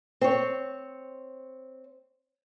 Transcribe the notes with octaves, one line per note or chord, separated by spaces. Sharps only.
C4 C#5